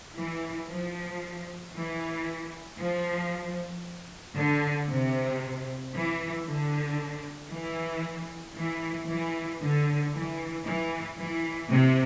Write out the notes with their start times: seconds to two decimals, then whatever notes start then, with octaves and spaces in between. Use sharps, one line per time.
0.17 E3
0.69 F3
1.75 E3
2.79 F3
4.37 D3
4.89 C3
5.94 E3
6.47 D3
7.51 E3
8.56 E3
9.09 E3
9.61 D3
10.14 E3
10.66 E3
11.19 E3
11.70 C3